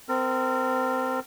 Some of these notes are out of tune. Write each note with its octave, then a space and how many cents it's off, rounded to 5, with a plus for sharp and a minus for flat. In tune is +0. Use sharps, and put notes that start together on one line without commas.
C4 -20 A#4 -30